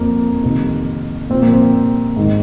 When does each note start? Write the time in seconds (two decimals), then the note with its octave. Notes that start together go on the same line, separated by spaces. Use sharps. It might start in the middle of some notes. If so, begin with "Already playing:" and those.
Already playing: F2 F3 A#3
0.43 F2 C3 D#3
1.30 A#2 F3 C4
1.42 A#3
1.54 C4
2.16 G#2 D#3